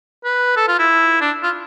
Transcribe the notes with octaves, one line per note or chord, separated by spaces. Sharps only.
B4
A4
F4
E4
D4
F4